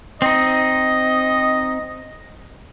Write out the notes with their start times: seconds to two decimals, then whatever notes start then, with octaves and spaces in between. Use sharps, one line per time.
0.22 C4 D#4 D#5